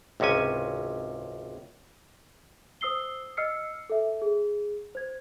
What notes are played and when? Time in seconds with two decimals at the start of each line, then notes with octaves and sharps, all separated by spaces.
0.20 G#1 C#2 C3 C#4 G#5
2.81 C5 D#6 E6 C7 G7
3.37 D#5 E6 F6 C7 C#7
3.90 A4 E5
4.22 G#4
4.95 C5 G#6